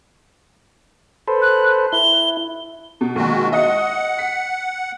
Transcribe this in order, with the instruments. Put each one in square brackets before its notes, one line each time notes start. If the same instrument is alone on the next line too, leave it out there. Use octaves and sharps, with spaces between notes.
[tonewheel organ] A4 B4 C5
[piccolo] F#6
[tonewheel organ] E4 [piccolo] G7
[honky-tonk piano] B2
[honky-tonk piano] A#1 D#3 [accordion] G#3 F#4
[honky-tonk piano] D#5 [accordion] F#5
[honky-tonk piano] B6